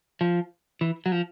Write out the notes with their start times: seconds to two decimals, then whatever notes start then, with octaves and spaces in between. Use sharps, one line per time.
0.21 F3
0.81 E3
1.06 F#3
1.12 F3